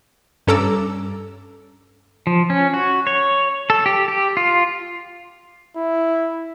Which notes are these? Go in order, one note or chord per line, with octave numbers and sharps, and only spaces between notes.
G2 C#4 A4 A#5 D6 E6
F3
C#4
F#4
C#5
A4
G4
G4
F4
E4